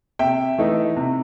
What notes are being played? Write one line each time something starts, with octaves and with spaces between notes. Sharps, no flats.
C3 E5 G5
E3 A3 D#4
C3